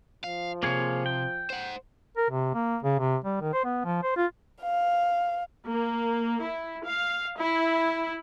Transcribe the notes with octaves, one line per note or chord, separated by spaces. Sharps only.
F3 F5
D#2 C3 A#3 G#4 C#5
G5
C5 F#5
A#4
C3
A#3
C#3
C3
G3
D#3
C5
B3
F3
C5
F4
F5
A#3
E4
F5
E4